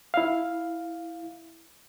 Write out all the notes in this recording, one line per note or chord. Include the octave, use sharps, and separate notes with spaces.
E4 F5